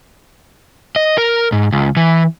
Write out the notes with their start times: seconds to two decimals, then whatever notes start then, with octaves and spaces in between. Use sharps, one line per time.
0.96 D#5
1.18 A#4
1.52 G#2
1.72 C#2
1.97 E3